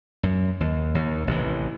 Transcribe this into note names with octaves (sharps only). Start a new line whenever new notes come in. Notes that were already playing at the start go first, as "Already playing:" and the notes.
F#2
D#2
D#2
A1 C3 E3